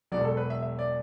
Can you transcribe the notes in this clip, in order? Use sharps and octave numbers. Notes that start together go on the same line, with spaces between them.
E1 E2 B2 F#3 D5
A4
B4
E5
E5
D5